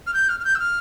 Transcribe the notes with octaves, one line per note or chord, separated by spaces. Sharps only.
F6
G6
F6
F6
G6
E6
F6